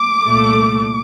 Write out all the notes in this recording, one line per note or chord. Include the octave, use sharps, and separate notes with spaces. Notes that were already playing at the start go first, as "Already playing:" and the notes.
Already playing: D6
C2 A#2 A3